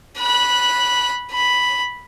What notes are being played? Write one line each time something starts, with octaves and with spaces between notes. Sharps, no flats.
B5 F#6
B5